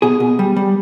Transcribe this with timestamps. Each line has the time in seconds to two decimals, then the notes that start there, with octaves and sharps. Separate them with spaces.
0.02 B2 G#4
0.20 B2
0.39 G3
0.56 G3